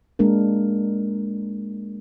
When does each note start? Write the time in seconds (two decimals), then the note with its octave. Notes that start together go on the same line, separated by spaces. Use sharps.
0.19 G#3 A#3 D4 A#4